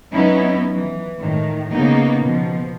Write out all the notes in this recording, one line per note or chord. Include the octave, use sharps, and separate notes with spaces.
F#3 B3 C#4 D#4 E4
E3
A2 D#3
C#3 A#3 B3 D#4
B2 F3